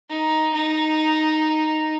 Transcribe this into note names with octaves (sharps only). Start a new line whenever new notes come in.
D#4
D#4